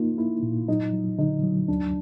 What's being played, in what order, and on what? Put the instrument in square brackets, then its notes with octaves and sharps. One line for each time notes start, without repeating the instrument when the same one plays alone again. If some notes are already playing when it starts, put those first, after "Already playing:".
Already playing: [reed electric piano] A#3 D#4 [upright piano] F4
[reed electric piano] A#3 [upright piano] E4
[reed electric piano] A#2
[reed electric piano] F#3 [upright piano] D#4
[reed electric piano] F#3
[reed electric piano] D3 [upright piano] D#4
[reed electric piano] F#3
[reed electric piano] D2 [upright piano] D4